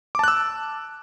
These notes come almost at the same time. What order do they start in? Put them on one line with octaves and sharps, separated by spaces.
D6 A5 F#6 E6